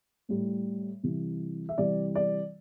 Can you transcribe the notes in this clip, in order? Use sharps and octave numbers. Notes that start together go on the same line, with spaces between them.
A2 G3
C3 E3 G3
E5
C3 E3 G3 D5
D5